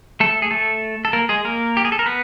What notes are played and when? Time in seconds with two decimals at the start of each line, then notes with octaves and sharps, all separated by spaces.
0.20 A3 A4
0.42 G#4
0.51 A3 A4
1.05 A4
1.13 A#3 A#4
1.29 G#3 G#4
1.45 A#3 A#4
1.77 G4
1.85 G#4
1.92 A4
1.99 A#4
2.06 B3 B4